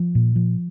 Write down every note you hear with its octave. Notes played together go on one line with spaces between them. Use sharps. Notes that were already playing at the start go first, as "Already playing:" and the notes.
Already playing: F3
A#2
F3